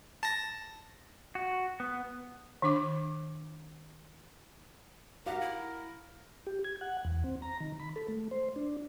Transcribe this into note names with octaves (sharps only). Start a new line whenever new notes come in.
A5 A#6
F#4
B3
D#3 D4 D6
F#4 G4 A#4 F5 F#5
E4
G4
G#6
F#5
E2
C4
A#5
D#3
B5
A4
A3
C5
D4